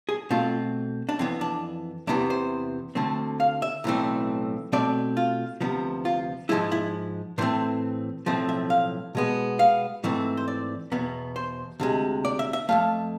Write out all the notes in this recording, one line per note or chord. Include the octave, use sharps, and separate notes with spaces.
G#4
B2 A3 C4 F4
D4
F2 E3 B3 C4
D4
E2 C3 E3 B3 D4
C5
D2 D3 A3 C4
F5
E5
B1 A2 E3 A3 C4
B2 A3 C4 D5
F4
D2 C3 F3 B3
F4
G#2 F3 G#3 E4
E4
A2 E3 A3 C4 C5
B1 A2 F3 A3 C4 C5
E5
F5
B2 G#3 B3
F5
G#2 E3 A3 C4
C5
D5
E2 B2 B3
C5
D2 C3 G#3
D5
E5
E5
F2 E3 A3 F5